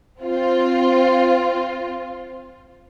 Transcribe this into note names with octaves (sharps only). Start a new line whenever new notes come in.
C4 F4